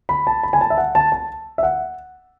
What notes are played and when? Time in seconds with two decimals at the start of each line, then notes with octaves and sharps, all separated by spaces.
0.09 B5
0.27 A5
0.43 B5
0.53 G#5
0.61 A5
0.70 E5
0.78 F#5
0.95 A5
1.12 A5
1.58 E5
1.63 F#5